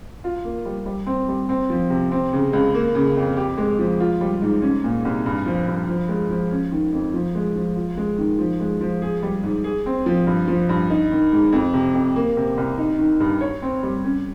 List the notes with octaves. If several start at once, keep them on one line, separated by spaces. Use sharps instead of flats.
F4
A#3
G3
G3
C4
G3
C4
F3
C3
C4
C#3
C#2
A#3
C#3
F2
G4
G#3
F3
F4
G3
G#2
C#4
A#2
C2
G2
F3
G2
F3
G#3
F3
C#4
D#3
F2
F3
G#3
F3
F4
G#3
D#3
F3
G#3
F3
G#4
G3
G#2
G#4
C4
F3
G2
F3
G2
D#4
D#3
G#2
F2
C3
F2
A#3
C3
C2
D#4
D#3
G2
C#5
C4
G3
C#4